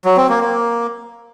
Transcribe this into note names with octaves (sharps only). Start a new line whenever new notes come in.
F#3
C4
A#3
A#3